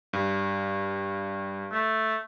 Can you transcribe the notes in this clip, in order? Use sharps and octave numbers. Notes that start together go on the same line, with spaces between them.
G2
A3